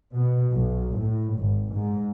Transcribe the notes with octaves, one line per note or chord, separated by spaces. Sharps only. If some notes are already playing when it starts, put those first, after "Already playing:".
B2
B1
A2
G#1
G#2